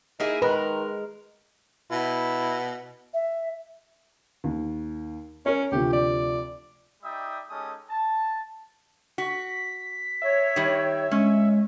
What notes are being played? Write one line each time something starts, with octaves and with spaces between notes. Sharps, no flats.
A#3 D#4 E4 G#4
D#3 G#3 A#4 B4
B2 E4
E5
D#2
C#4 A#4 C#5
D2 C3 F3 G4
D5
G3 D#4 D5 E5 G5 D#6
G#3 C#4 D#4 G4 A4 D#6
A5
F#4 B6
C#5 E5
D#3 G3
G#3 C#4